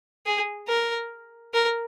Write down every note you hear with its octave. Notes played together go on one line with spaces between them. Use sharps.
G#4
A#4
A#4